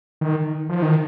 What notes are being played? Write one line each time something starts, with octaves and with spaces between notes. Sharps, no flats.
D#3
F3
D#3